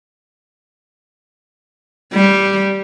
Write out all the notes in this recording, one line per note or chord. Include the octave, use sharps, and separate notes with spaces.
G3